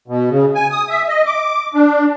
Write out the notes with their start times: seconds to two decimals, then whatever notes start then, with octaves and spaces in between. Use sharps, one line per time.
0.08 B2
0.30 C#3
0.55 G#5
0.71 D#6
0.89 E5
1.09 D#5
1.26 D6
1.74 D4